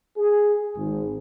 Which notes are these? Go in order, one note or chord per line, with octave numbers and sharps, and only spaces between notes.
G#4
G#1